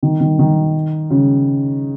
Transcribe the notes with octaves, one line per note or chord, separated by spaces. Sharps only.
D#3
D#3
D#3
C#3